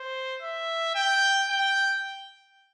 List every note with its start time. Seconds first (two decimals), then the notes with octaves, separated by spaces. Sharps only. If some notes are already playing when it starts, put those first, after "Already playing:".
Already playing: C5
0.42 E5
0.95 G5
1.50 G5